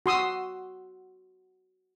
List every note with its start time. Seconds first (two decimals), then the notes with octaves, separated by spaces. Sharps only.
0.06 F#4 C6 D#6 E6